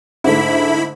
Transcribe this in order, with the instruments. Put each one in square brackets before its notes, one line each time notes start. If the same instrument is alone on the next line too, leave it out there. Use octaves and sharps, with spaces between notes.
[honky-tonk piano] G#2 D3 A3 [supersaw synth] E4 B5